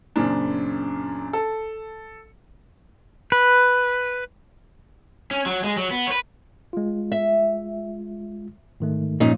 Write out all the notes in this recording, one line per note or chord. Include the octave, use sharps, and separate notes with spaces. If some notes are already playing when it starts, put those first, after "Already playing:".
F#2 A#2 C#3 C4 D4
A4
B4
C#4
F#3
G#3
F#3
B3
B4 C#5
G#3 F4
E5
G#2 D#3 A3
G2 A#2 F3 C#4 D#4